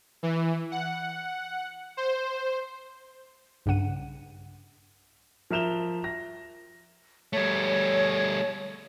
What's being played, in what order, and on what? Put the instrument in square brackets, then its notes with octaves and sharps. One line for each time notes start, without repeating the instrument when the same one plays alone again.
[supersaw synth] E3
F#5
C5
[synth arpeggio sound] B1 G2 C#3 F#5 D#7
[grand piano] F3 A#4 E5 E7 F7 G7
A#6
[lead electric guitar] G3 A3 [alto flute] C#5